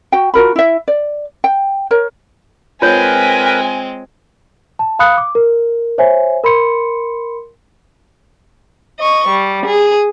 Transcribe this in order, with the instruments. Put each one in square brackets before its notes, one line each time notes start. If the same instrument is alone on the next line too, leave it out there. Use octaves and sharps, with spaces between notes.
[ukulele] F#4 G5
F4 F#4 A#4 B5
E4 E5
D5
G5
A#4 C#5
[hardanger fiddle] G#3 C4 [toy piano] F4 C#5 [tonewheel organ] A#4 B4 [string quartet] G#5
[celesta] A5
F5 B5 D#6 F#6 C#7
D6
A#4
C5 C#5 E5 G#5
A#4 B5 C6 C#7
[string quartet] D#5 C#6
G3
G#4